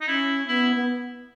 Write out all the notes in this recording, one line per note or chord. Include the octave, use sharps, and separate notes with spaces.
D#4
C#4 E4
B3 E4
B3